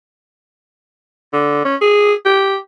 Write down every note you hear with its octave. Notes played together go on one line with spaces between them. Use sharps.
D3
C#4
G#4
G4